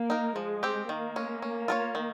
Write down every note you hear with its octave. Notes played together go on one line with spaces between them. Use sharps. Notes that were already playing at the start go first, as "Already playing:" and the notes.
Already playing: A#3
D#4 A#4
F3 G#3
C4 G4
D#3 A#3
G#3 C#4
C#4
F4 A#4 C#5
D#3